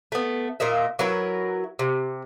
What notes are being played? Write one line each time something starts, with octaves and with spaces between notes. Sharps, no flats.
A3 B3
A#2 A#4 D#5 E5
F#3 E4 A#4 B4
C3